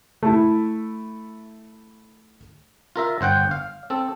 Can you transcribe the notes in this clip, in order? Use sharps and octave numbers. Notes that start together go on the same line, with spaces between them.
A3 E4
F4 A#4 E5
G1 C5 F#5 G5
F5
C4 A4